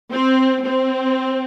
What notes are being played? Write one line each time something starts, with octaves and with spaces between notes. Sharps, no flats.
C4
C4